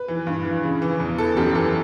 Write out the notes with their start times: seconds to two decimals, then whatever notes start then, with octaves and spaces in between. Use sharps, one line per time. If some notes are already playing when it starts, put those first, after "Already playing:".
Already playing: B4
0.08 E3
0.27 G2
0.45 E3
0.63 C#3
0.82 E3
1.00 E2
1.18 E3 A4
1.37 F#2 G4
1.55 E3 A4